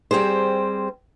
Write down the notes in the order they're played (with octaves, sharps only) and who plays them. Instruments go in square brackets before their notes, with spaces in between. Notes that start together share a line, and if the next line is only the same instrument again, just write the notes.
[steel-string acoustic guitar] G3 C4 G4 G#4 C5